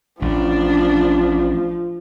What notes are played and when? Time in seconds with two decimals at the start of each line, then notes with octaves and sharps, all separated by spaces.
0.22 A1 F3 D4